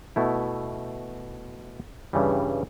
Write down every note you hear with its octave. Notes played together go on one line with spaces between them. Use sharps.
B2 A3 E4
G2 C#3 E3 G3